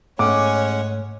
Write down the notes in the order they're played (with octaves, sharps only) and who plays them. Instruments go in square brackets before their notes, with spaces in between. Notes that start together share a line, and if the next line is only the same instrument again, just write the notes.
[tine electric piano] G#2 A3 [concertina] G#3 C#4 F#5 [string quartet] C#5 [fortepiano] D6